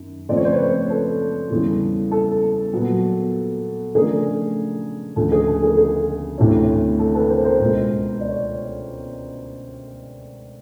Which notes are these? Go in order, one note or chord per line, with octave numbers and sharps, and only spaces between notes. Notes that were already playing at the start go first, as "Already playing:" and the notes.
Already playing: F#2 D#3
C#3 F3 A3 C4 D5
C#5
C5
B4 C#5
A4 B4
E2 C#3 E3 G3
A4
A#2 F#3 B3
C#3 F3 A3 D4 G#4 A#4
D2 C#3 F3 A4
G#4
A4
G#4 A#4
G#4
D2 C3 E3 A3 C#4
A4
A4 B4
A#4 C5
A#4 C5
C#2 B2 G#3
D5
C#5